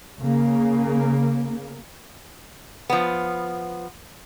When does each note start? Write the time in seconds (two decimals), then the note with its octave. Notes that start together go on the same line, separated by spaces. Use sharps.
0.20 C#3 A#3
2.90 F3 B3